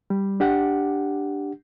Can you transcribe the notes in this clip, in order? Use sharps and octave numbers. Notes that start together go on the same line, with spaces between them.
G3
D4 G4 F#5